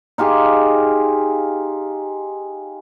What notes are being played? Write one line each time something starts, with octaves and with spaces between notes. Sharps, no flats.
D#4 F4 G4 G#4